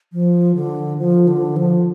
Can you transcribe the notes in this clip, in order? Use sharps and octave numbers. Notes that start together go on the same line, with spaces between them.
F3
D3
F3
D3
F3